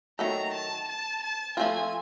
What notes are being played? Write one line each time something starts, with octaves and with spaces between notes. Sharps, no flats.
D#3 F#3 A3 A#5
A5
A5
A5
F3 A3 C4 F4 G#5